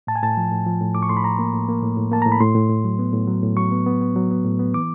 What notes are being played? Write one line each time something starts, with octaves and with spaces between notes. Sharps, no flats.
A2 A5
G#5
A2 A5
F3
A2
F3
A2
A2 D6
C#6
A2 C6
B5
A2 A#5
A#3
A2
A#3
A2
A2
A#3 A5
A2 A#5
B5
A2 C6
A2
A2
F#3
B3
A2
F#3
A2
F#3 C#6
B3
B3
B3
F#3
B3
A2
B3
E3 D6